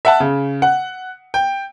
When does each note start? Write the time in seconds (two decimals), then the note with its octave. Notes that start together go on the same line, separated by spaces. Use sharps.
0.05 E5 F#5 A5
0.20 C#3
0.62 F#5
1.34 G5